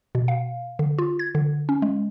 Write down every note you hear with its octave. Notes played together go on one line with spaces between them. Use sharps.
B2
F5
D3
F4
G#6
D3
C#4
G#3